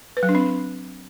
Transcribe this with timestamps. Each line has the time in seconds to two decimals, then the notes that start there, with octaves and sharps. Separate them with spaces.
0.17 B4
0.23 F#3
0.29 D4
0.35 C4